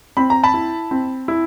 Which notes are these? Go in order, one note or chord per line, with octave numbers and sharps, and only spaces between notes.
C4 B5
A#5
A5 B5
E4
C4
E4